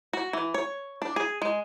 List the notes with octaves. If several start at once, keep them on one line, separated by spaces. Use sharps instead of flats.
F#4
E3
C#5
D4
G#4
G#3